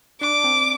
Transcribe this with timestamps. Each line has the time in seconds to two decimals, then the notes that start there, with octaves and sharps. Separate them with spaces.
0.21 D4 D6
0.44 C4